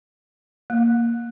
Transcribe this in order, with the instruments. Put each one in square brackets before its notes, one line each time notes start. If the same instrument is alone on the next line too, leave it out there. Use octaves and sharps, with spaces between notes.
[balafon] A#3